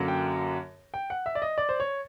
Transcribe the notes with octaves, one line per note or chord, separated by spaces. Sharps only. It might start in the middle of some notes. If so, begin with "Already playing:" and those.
Already playing: F#2 D3 F#3 A#3
G5
G5
F#5
E5
D5
D#5
D5
C5
C#5